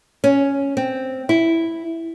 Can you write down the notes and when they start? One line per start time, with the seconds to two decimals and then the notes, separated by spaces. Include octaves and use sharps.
0.24 C#4
0.77 C4
1.29 E4